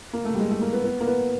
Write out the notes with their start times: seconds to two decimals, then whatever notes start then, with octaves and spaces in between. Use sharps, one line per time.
0.13 A#3
0.25 A3
0.35 G3
0.39 G#3
0.51 A3
0.61 A#3
0.73 B3
0.84 B3
1.00 A#3
1.07 B3